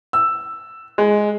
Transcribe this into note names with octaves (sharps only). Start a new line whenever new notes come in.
E6
G#3